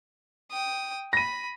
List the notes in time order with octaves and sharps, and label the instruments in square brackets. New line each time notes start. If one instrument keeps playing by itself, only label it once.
[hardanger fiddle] G5 D#6
[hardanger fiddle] B5 [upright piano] A#6 D#7